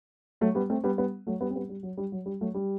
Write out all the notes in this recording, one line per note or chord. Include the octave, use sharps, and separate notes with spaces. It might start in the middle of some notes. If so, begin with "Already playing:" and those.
F#3 A3
G3 B3
A3 C4
G3 B3
G3 B3
F#3 A3
G3 B3
C4
G3 B3
G3
F#3
G3
F#3
G3
F#3 A3
G3